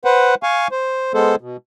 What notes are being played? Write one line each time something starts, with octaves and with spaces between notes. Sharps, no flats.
B4 C5 F#5
F5 G#5 C#6
C5
G#3 B3 A4 C5
B2